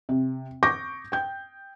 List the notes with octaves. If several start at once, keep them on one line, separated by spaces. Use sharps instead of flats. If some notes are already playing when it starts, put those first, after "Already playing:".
C3
C#6 D6 G6 A#6
G5 G6